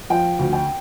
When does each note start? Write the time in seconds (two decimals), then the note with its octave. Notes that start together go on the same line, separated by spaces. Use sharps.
0.10 F3 G5
0.39 D2
0.53 G5